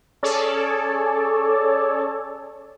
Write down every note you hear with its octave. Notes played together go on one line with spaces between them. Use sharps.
C#4 G#4 A4 C#5 D5 A5